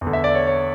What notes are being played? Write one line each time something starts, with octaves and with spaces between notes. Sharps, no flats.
E2
D3
E5
D5
C#5
C#5